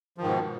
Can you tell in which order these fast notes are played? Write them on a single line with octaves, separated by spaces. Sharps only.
F3 D#3 G#2 B2